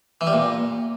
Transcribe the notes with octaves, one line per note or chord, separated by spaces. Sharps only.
E3
G3
A#2